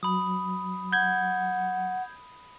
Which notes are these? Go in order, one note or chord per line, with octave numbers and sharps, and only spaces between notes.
F#3 B5 D#6
F#5 G6 G#6